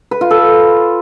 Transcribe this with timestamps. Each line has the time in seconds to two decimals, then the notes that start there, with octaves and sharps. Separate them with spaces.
0.11 B4
0.21 F4
0.31 A4